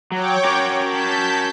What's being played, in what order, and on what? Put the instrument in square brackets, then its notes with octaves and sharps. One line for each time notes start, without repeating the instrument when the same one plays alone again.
[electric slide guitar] F#3 [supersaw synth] C#5 G5 D6
[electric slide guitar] C#4 F#4 A#4
[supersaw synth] A5 G6 B6